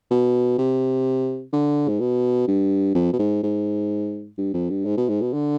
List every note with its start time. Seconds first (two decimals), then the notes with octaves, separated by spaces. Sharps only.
0.10 B2
0.58 C3
1.53 D3
1.88 G#2
2.00 B2
2.47 G2
2.95 F2
3.13 B2
3.19 G#2
3.43 G#2
4.38 G2
4.54 F2
4.70 G2
4.85 G#2
4.97 B2
5.08 G#2
5.22 B2
5.33 D3